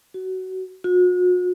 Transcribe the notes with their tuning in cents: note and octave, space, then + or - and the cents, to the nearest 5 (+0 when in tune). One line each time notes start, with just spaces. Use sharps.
F#4 +20
F#4 -40